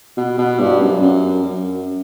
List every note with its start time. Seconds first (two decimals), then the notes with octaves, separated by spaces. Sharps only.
0.17 B2
0.38 B2
0.60 G2
0.80 F#2
1.02 F#2
1.44 F#2